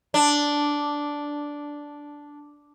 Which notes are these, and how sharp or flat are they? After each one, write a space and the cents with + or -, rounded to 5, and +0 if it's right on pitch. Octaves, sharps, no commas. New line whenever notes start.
D4 -5